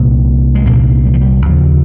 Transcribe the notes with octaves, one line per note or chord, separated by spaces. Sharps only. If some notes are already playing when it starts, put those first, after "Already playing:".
Already playing: C2 A#2 C4
G#3
C2 A#2 A#3
G3
F3
G3
D#2 C#3 F3